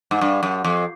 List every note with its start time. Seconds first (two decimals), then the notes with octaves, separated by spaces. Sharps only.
0.11 G#2
0.21 G2
0.43 F#2
0.65 F2